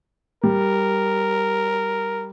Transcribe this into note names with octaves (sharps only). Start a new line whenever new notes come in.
G3 A#4